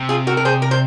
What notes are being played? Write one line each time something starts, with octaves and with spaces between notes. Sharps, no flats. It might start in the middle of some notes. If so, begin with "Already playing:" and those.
Already playing: C3
F4 G#4
F#4 A#4
A#4
G#4 C5
A#4
C5